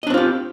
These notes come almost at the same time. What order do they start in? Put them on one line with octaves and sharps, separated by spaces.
D#5 D4 C4 F4 G4